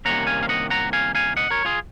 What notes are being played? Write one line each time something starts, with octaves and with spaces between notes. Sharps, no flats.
C2 C3 D#3 A#3 C#4 F#5 A#5
F5 G#5
F5
D#5 F#5
F#5 A#5
F5 G#5
F5 G#5
D#5 F#5
A#4 C#5
F4 G#4